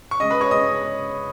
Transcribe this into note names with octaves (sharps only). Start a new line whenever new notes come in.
C#6
C#3 G#3 D#5 D#6
B4 B5
C#5 C#6
C#3 G#3 D#5 D#6